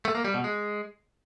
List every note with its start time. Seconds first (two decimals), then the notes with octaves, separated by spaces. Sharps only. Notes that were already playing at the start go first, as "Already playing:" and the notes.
0.05 A3
0.15 A#3
0.25 G3
0.34 B2
0.44 G#3